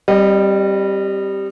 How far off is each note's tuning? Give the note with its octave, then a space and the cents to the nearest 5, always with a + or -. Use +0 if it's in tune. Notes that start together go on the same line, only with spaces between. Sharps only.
G3 +0 C4 +20 D#5 -30